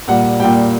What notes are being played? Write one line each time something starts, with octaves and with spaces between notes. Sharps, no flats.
A#2 G3 F#5
A#2 G3 G5